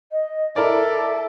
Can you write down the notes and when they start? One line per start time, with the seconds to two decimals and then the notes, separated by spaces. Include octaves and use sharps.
0.12 D#5
0.56 E4 A4 A#4 D5 E5